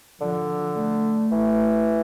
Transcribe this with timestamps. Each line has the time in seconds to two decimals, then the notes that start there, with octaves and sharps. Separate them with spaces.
0.20 D3 F3
0.76 A3
1.31 E3